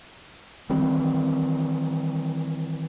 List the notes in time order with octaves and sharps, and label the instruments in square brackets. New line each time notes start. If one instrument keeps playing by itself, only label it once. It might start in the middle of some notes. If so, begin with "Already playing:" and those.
[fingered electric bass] D#3 E3 G3 C4